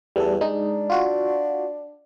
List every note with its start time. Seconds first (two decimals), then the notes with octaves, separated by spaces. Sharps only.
0.16 E2 G3 A4
0.41 G#3 D4 D#4
0.90 F4 F#4